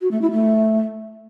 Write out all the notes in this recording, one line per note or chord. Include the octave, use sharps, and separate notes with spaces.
F#4
A3
E4
A3